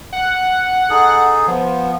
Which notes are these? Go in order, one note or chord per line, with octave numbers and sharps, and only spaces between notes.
F#5
D#4 G#4 A4
F3 B3